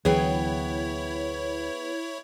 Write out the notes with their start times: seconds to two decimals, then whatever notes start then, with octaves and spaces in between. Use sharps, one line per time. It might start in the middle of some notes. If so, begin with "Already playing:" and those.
0.05 D2 E3 F#3 B3 E4 G#4 C#5 G5